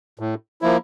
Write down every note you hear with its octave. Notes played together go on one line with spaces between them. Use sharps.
A2
F3 A#3 E4